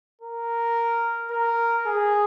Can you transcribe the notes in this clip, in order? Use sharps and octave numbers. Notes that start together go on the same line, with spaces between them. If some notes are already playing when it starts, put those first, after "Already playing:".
A#4
A#4
G#4